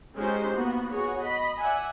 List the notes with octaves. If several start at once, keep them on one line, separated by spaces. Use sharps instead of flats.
G#3 C#4 D#4 F4 G4 C5
A#3 B3 F#4
B3 F#4 G#4 C#5
D#5 B5
D5 E5 F#5 G#5